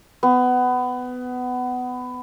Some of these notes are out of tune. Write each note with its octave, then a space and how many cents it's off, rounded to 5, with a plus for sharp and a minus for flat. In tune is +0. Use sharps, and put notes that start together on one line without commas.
B3 +20